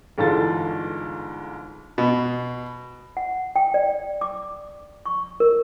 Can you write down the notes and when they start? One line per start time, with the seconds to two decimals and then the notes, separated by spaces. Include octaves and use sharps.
0.18 G1 G#2 E3 F4 A4 A6
1.98 B2
3.17 F#5
3.56 G5
3.74 D5
4.21 D6
5.06 C#6
5.40 A#4